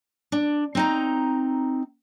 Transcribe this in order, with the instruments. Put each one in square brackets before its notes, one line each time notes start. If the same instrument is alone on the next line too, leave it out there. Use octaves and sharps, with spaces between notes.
[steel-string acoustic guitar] D4
C4 D#4 A#5